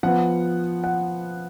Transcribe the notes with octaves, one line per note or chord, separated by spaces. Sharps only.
F3 B3 F#5
F#5